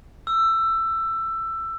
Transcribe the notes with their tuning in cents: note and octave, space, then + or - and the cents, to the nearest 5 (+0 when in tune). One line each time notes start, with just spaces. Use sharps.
E6 +15